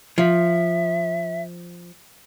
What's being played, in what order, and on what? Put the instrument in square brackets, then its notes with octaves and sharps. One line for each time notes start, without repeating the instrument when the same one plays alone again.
[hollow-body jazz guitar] F3 [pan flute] E5